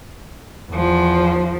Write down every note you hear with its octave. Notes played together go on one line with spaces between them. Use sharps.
E2 F3